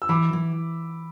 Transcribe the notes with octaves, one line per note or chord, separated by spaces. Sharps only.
E6
E3 B5 D6
E3